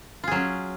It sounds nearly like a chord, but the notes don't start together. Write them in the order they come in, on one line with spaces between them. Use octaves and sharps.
F4 G#4 F#3 C#4